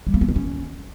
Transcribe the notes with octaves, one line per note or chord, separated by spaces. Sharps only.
G3
A#3
B3
C4
C#4